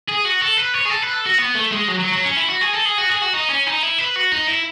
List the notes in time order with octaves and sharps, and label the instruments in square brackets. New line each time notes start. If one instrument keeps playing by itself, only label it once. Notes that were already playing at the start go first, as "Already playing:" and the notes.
[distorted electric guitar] G#4
F#4
A4
B4
C#5
G#4
A4
B4
A4
F#4
B3
A3
G#3
F#3
F#3
F#3
C#4
E4
F#4
G#4
A4
G#4
F#4
G#4
F#4
D#4
C#4
D#4
E4
B4
F#4
D#4
E4